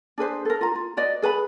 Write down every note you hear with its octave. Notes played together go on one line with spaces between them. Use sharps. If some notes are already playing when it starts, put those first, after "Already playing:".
D4 G#4 B4 C5
A4 A#4
F4 A#5
F4
F#4 B4 D5 D#5
G#4 B4 A5 B5